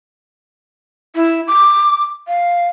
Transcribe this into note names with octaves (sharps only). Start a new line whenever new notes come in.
E4
D6
F5